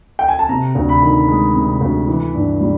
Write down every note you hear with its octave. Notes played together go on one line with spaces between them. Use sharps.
G5
G#5
A5
C3 A#5
D2
B5
D#3
G#3
C3
D2
E3
G2
G3